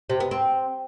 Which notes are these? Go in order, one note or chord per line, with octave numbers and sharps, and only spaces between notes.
C3
B3
C4